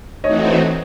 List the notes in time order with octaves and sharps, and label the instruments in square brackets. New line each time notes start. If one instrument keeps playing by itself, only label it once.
[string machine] E3 A3 C4 D#4 F#4 [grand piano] C#5 D#5